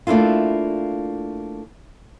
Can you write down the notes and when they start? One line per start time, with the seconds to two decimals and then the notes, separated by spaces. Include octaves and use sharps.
0.07 A3 A#3 D4 E4 F4